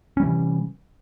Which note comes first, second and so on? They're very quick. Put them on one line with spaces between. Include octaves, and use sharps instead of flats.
C#4 G3 E3 C3